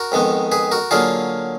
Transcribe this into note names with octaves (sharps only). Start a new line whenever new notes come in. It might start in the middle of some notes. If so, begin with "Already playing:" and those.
Already playing: F#4 A#4
F2 D#3 G#3 B3
G#4 B4
F#4 A#4
D3 F#3 A#3 F4 G#4